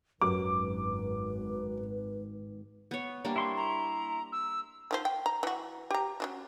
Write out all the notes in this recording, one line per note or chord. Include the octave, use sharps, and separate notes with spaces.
G#1 F#2 B4 D6
B3 C#5
G3 A#3 D4
E4 C6 C#6
A#5
E6
D#3 F3 C5
G5
A#5
E3 F#4
G4 A#5
C#4 D4 F#4